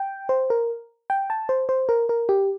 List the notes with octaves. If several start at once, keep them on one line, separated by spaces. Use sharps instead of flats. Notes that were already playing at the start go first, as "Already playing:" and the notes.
Already playing: G5
C5
A#4
G5
A5
C5
C5
A#4
A#4
G4